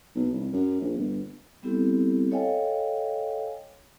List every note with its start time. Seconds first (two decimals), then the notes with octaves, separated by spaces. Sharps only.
0.15 B1
0.34 C2
0.52 F#2
0.81 A#1
0.97 G1
1.63 G3 B3 C4 E4 G4 A4
2.31 A4 C#5 D#5 F5 G5 G#5